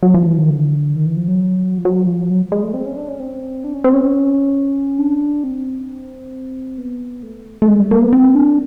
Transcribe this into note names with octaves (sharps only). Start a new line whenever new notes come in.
F#3
F3
E3
D#3
D3
D#3
E3
F3
F#3
F3
F#3
F3
F#3
G#3
A3
C4
C#4
D4
C#4
C4
D4
C#4
C4
C#4
D4
C4
B3
A3
A3
G#3
G3
A#3
B3
C4
D4